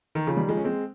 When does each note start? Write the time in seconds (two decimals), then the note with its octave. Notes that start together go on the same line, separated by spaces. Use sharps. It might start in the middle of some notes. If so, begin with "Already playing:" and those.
0.15 D#3
0.27 C#3 F3
0.37 D#3 G3
0.48 F3 G#3
0.57 C#4
0.64 G#3 C4